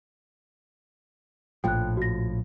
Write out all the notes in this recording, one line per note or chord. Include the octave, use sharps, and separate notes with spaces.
A#1 A2 F3 G5 F#6
F#4 A#6